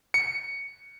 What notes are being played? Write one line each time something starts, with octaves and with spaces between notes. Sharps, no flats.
C#7